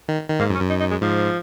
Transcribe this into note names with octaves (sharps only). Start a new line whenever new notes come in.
D#3
D#3
G#2 A#3
F#2
C#4
F#2
D#4
D#4
G#3
G#2 F3